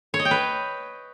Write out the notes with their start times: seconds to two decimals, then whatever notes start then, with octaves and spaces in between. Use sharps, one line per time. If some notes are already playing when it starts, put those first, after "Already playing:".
0.14 C#5
0.20 D#5
0.25 G5
0.31 B4